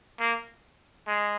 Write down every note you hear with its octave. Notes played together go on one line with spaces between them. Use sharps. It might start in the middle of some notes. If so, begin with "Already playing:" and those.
A#3
G#3